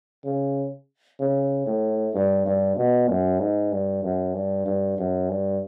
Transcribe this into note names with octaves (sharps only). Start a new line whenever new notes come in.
C#3
C#3
A2
G2
G2
B2
F#2
G#2
G2
F#2
G2
G2
F#2
G2